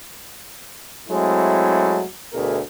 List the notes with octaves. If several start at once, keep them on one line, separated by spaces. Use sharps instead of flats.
F#3 G#3 A3 C4 E4
D2 B2 A3 G#4 A#4